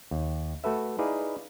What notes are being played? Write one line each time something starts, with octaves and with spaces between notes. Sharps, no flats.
D#2
A3 F#4 A4 B4 E5
D#4 E4 G#4 B4 D5 F5